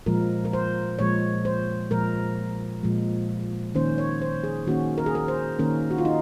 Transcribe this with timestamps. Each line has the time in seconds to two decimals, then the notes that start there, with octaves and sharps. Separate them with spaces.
0.06 A#2 F3 G#3 A#4
0.45 A#4
0.53 C5
0.99 A#2 F3 G#3 C#5
1.45 C5
1.91 A#2 F3 G#3 A#4
2.83 A#2 F3 G#3
3.75 D#3 A#3 C#4 C5
3.98 C#5
4.22 C5
4.44 G#4
4.67 D#3 A#3 C#4 F#4
4.98 A#4
5.06 G#4
5.15 A#4
5.28 C5
5.59 D#3 A#3 C#4 A#4
5.91 F#4
5.98 F4
6.05 D#4